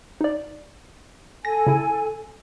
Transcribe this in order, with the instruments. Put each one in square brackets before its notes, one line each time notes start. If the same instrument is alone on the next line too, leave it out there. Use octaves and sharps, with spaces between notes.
[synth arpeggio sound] D#4 D5
[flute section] A4 G#5 [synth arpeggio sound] A#6
[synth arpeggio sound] C#3 E4